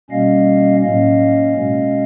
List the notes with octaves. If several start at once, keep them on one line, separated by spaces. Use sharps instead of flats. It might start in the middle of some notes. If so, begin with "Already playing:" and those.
B2 G3 A#3 C#4 D#5 F5
A2 F#3 A#3 C#4 D#5 F5
B2 G#3 C#4